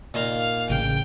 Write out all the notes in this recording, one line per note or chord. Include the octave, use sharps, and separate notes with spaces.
A#2 D#4 F5
A1 C#3 G5